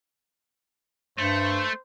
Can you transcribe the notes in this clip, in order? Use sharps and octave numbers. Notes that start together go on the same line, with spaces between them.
G2 A3 C5